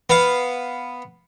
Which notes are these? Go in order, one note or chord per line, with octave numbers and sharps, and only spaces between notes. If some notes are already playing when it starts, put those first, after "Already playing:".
B3 F5